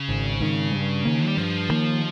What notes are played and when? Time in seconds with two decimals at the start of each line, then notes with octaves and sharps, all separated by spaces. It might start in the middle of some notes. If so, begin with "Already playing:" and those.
Already playing: C#3
0.09 G#1
0.40 G#2 D#3
0.73 G2
1.05 D#3 A#3
1.26 G3
1.37 G2 F3
1.70 D#3 A#3